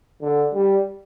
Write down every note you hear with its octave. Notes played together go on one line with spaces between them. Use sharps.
D3
G3